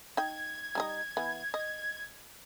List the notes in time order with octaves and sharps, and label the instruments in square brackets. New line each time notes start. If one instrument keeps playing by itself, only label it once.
[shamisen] D#4 G5 [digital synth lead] G#6
[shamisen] G3 D#4 D#5
E3 B3
D#5